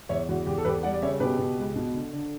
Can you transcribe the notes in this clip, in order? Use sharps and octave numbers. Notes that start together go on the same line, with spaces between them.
E2 C#5 E5
E2 F#4
E2 G4
A4
E2 G4 B4
G3 D5 F#5
D5
C#3 C#5 E5
B2 G4 B4
B2
C#2
B2
D3
D3